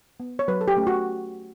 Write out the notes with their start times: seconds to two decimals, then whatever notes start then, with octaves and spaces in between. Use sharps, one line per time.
0.20 B3
0.39 C#5
0.48 F#3 B4
0.61 A4
0.68 G4
0.77 A3 C#4
0.87 F#4